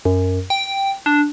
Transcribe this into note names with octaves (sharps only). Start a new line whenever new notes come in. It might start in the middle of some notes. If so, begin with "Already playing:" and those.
F#2
G5
D4